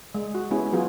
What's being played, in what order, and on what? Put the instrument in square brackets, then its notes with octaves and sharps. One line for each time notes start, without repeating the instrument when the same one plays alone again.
[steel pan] G#3
F#4
G#3 B3 C#4 E4 G4 G#4
E3 F#3 B3 F4 F#4 G#4